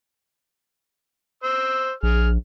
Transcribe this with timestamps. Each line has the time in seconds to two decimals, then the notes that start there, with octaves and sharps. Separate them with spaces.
1.43 C5 E6
2.03 A#1 G#4 F6